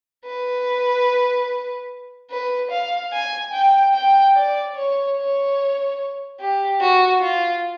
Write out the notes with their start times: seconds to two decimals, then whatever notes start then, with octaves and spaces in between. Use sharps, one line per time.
0.26 B4
2.31 B4
2.71 F5
3.13 G#5
3.53 G5
3.94 G5
4.36 D5
4.75 C#5
5.16 C#5
6.40 G4
6.81 F#4
7.22 F4